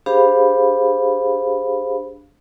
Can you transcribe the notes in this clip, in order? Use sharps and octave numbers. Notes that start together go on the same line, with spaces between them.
D4 G4 G#4 C5 F5 B5